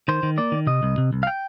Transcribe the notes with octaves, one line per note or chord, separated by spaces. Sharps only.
D#3 C5
D#3
A#3 D5
D#3
C3 D#5
C2
C3
C2
F5
G5